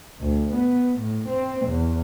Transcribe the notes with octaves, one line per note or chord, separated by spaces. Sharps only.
D2
B3
A2
C4
E2